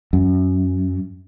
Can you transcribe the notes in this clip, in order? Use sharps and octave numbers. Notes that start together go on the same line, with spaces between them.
F#2